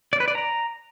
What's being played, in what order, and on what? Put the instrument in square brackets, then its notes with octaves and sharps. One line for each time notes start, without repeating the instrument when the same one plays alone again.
[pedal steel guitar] D5
B4
D5
A#5